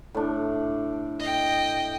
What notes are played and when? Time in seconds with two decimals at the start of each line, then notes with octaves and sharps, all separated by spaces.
0.15 A2 D4
1.20 D#5 G5